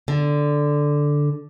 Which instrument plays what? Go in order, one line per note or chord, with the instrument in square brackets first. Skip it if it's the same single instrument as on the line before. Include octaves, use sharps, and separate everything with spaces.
[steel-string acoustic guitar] D3